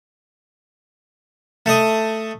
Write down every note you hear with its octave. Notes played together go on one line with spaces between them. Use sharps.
A3 D#5